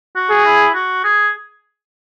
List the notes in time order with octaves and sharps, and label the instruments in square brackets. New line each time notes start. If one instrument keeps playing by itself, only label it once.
[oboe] F#4
[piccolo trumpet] G#4
[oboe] E4
F#4
G#4